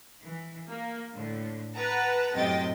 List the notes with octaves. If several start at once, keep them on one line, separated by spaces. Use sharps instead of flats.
E3
A#3
A2 D3
B4 F#5 A5 A#5
F#2 A2 C3 D#5 G5 A6